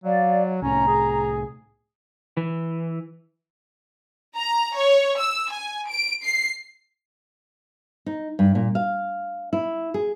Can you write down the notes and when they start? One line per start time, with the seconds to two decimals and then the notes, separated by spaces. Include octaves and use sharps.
0.04 F#3 D5 F5
0.62 C2 A2 C#4 A#5
0.87 G#4
2.37 E3
4.36 A#5
4.75 C#5
5.19 E6
5.50 G#5
5.90 D7
6.23 C7
8.06 D#4
8.39 G2
8.55 A#2
8.75 F5
9.53 E4
9.94 G#4